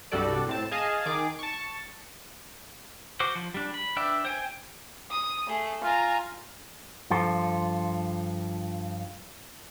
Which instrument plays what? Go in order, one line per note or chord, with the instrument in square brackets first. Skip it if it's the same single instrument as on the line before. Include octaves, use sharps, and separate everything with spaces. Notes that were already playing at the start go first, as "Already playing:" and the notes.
[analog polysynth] C2 G2 G3 F#4 A4 D5
A2 C4 A5
G#4 D#5 F5 G#5 A5
D#3 G#4 D6
A5 C#6
[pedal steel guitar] F#4 C5 D6
F3
G3 D4
B5
D4 B4 D5 E5 G5
C5 G5 G#5
[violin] D#6
A3 G#4
[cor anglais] F4 [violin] G#5 A#5
[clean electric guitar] G2 F3 F4 A4 C5